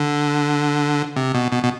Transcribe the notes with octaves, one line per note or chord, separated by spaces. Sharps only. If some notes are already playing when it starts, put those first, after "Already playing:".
Already playing: D3
C3
B2
B2
B2